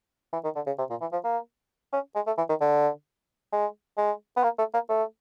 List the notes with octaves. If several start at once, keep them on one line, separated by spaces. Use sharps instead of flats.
E3
D#3
D3
C#3
C3
A#2
E3
F3
A#3
C#4
G#3
A3
E3
D#3
D3
G#3
G#3
B3
A#3
A3
A#3
A3